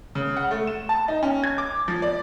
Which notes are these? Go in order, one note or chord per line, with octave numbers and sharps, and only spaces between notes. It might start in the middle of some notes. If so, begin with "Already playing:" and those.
C#3
F#5
A3
E7
A5
D#4
C#4
G#6
D6
F3
D5